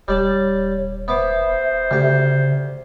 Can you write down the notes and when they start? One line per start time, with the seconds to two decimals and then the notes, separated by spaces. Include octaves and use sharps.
0.08 D#1 G3 C#5 D5 A5
1.08 B3 C5 E5 D6
1.91 D2 C#3 G4